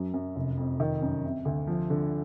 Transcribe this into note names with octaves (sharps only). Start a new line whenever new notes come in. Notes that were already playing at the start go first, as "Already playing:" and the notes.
Already playing: F#2 F#3
F#2
F1
F2
D#3
F#2
C3
D2
F3
D3